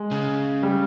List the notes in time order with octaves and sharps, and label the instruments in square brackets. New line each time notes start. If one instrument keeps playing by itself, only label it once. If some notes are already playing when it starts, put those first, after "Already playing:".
Already playing: [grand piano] G#3
[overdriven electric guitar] C#3
[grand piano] G3